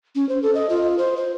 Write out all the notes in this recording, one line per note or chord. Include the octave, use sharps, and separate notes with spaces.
C#4
C5
A4
D#5
F4
C5
C5